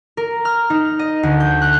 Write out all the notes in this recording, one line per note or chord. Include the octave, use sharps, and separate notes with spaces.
A#4
F6
D#4
D#5
D2
G6
F#6